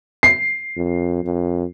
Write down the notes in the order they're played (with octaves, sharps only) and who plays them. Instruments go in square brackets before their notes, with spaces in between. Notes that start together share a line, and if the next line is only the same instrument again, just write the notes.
[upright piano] C7
[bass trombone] F2
F2